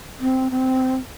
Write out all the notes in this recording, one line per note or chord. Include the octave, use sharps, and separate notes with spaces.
C4
C4